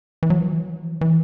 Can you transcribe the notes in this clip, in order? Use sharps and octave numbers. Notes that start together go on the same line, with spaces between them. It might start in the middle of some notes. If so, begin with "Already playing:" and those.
E3
F#3
E3
F#3
E3
F#3
E3
F#3
E3
E3